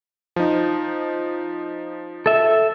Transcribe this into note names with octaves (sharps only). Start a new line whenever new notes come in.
F3 D#4
A4 E5